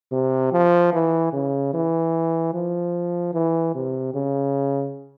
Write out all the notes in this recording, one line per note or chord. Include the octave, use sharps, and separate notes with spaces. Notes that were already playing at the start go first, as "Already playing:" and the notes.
C3
F3
E3
C#3
E3
F3
E3
C3
C#3